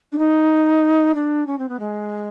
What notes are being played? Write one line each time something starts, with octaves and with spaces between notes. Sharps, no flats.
D4
D#4
D4
C#4
C4
B3
G#3